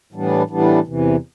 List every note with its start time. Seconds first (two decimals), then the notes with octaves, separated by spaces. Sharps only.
0.13 A2 E3 G3 B3 D4
0.50 A2 E3 G3 B3 D4
0.87 E2 C3 E3